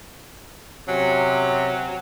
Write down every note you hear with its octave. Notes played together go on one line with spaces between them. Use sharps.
C3 F#3 C#4